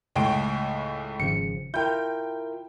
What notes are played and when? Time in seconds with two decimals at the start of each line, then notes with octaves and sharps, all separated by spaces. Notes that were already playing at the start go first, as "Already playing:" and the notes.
0.16 C#2 A2 G#5 C6 C#6 D7
1.20 G#1 C#3 F3 C#7
1.74 E4 F4 A#4 G5 G6